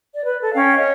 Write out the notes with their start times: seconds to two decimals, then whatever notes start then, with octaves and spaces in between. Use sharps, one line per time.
0.15 D5
0.27 B4
0.41 A4
0.54 C#4 F5 G5
0.75 C#5 D#5